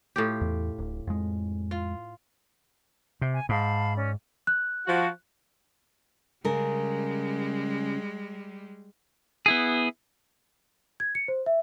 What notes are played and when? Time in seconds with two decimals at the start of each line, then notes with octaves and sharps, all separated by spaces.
0.16 A2 F4 G4
0.41 E2
0.78 D1
1.07 F2 G#3
1.71 F4
3.22 C3
3.34 G#5
3.49 G#2 F5 A5 B5
3.96 C#4 D5
4.47 F#6
4.87 F3 F#4
6.45 C#3 G3 G#3 A#4
9.46 B3 E4 G#4
11.00 G#6
11.15 C#7
11.28 C5
11.46 E5